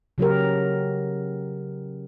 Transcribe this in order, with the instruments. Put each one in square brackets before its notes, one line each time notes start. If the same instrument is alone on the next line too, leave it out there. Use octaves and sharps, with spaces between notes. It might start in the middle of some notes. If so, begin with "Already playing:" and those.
[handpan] C#3 F#3 G4 A#4